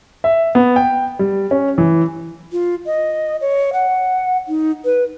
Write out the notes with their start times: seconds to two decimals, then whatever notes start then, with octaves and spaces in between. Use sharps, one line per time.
0.24 E5
0.55 B3
0.76 G5
1.19 G3
1.51 C#4
1.78 E3
2.52 F4
2.86 D#5
3.41 C#5
3.73 F#5
4.48 D#4
4.85 B4